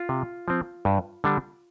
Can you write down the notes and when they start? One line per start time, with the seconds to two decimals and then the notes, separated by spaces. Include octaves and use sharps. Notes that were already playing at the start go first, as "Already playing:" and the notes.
Already playing: F4
0.09 C3
0.48 F3 C4
0.85 G2
1.24 D3 G3 D4